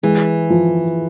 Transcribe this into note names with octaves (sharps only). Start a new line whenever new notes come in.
E3 G#3
F3